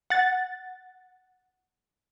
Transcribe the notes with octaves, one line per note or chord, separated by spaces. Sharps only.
F#5 A6